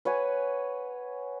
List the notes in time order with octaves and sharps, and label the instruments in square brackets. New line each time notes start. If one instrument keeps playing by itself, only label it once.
[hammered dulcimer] B4 C#5 F#5 G#5